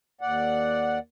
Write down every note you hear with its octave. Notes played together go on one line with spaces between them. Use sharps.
D#2 D5 F#5